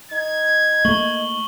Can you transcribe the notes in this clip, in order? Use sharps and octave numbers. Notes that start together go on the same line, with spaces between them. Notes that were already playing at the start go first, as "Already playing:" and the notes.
D#4 G#6
A3 A#3 C#6 F#7 G7